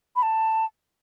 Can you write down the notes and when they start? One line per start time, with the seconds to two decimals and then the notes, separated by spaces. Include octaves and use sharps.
0.16 B5
0.23 A5